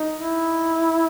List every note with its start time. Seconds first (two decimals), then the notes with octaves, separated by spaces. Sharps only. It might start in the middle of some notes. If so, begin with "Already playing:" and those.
Already playing: D#4
0.17 E4